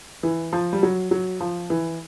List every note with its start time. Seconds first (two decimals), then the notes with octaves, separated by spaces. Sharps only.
0.23 E3
0.53 F3
0.73 G3
0.83 F#3
1.11 F#3
1.41 F3
1.70 E3